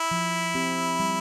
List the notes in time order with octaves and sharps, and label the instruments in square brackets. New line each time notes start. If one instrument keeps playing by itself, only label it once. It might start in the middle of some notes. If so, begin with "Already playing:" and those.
Already playing: [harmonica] E4
[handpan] F3
C4 G4
G3